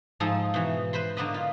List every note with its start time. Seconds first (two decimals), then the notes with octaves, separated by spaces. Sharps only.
0.20 G#2 F3 D#4 A4 D#5 A#5
0.54 B2 E3
0.93 B4 C5 B5 C6
1.17 D3 A#3 B3 B4 D#5
1.34 F4